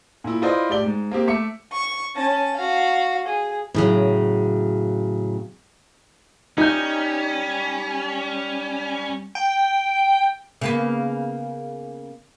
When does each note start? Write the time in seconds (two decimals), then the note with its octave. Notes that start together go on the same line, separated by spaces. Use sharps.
0.24 A#2 E4
0.42 E4 F4 B4 C5 D5 D#5
0.69 A2 G4 D5 G7
0.84 G#2
1.12 A#3 C4 G4
1.27 A3 E5 D6 C#7
1.72 C#6
2.16 C#4 A5
2.56 F#4 F5
3.27 G#4
3.74 A2 C#3 F#3
6.58 G3 C#4 D#4 G6
9.35 G5
10.61 C#3 A#3 B3